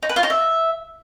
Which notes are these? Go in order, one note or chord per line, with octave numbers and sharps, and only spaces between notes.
D#4
B4
F4
D#4
E5